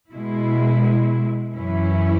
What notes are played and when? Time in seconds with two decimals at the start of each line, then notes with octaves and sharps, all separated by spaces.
0.13 B2 G#3 E4
1.54 F#2 E3 C#4 E4